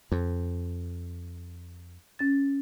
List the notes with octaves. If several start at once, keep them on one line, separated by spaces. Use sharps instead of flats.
F2
C#4 A6